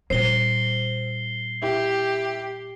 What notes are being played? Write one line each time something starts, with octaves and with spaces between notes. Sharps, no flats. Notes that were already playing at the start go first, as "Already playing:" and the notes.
A#2 G3 C4 C7 G7
E4 G4